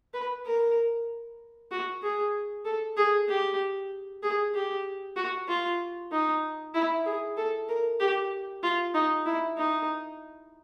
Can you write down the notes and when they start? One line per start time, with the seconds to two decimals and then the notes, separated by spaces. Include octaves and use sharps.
0.14 B4
0.45 A#4
1.71 F#4
2.02 G#4
2.65 A4
2.97 G#4
3.28 G4
4.23 G#4
4.54 G4
5.16 F#4
5.48 F4
6.12 D#4
6.74 E4
7.05 G#4
7.37 A4
7.68 A#4
8.00 G4
8.63 F4
8.94 D#4
9.25 E4
9.57 D#4